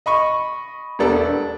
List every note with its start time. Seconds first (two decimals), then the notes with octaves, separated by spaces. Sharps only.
0.06 D#5 B5 C#6
0.99 E1 G3 B3 D4 A4 A#4
1.16 D4